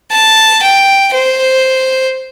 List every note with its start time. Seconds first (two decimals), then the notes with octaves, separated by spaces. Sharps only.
0.11 A5
0.62 G5
1.13 C5